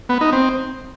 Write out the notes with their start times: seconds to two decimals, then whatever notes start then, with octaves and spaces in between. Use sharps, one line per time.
0.09 B3
0.21 D#4
0.33 C4